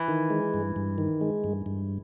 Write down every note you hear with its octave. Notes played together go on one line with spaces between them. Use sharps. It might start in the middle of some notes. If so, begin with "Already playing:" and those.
Already playing: E3
D#3
G#3
G2
G2
D#3
G#3
G2
G2